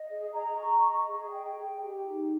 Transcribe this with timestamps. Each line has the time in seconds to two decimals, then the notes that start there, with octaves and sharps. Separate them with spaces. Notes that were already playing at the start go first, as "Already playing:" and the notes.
Already playing: D#5
0.08 G#4
0.34 A#5
0.58 C#6
0.82 D#5
1.07 G#4
1.32 G5
1.57 G#4
1.81 G4
2.05 D#4